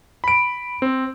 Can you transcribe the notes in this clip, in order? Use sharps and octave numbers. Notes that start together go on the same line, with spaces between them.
B5 D7
C4